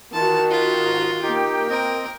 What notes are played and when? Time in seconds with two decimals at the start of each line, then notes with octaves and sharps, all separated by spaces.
0.13 D#3 E3 F4 F#4 A5
0.51 F4 B5
0.84 G#2 A#5
1.22 A#3 D#4 G4 G5
1.70 C4 A#4 D#5